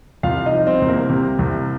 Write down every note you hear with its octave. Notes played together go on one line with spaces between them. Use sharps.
C2 F4 F5
D#4 D#5
F3
C4 C5
C2
A#3 A#4
C3
C2